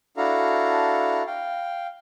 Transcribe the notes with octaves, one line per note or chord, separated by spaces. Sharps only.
D4 E4 F#4 A4 F5 A#5
F5 G5